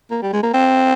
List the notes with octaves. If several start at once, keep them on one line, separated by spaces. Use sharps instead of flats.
A#3
G3
G#3
A#3
C4